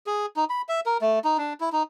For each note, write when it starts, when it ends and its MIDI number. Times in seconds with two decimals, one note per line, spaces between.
0.07 0.26 68
0.36 0.44 63
0.50 0.62 83
0.69 0.80 76
0.86 0.98 70
1.01 1.19 57
1.24 1.37 63
1.38 1.53 62
1.60 1.69 64
1.72 1.83 63